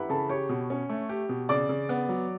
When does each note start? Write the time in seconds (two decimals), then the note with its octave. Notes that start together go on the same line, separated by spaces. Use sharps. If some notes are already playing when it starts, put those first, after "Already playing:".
Already playing: E4 G4 B4 F#5 B5
0.09 C#3 A4 A5
0.29 G4 C#5 C#6
0.49 B2
0.70 C#4
0.90 A3
1.09 G4
1.29 B2
1.49 C#3 D5 D6
1.69 C#3
1.89 B3
2.09 F#3